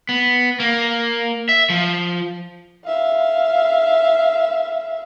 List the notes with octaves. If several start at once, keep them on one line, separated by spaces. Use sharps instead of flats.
B3
A#3
E5
F3
E5 F5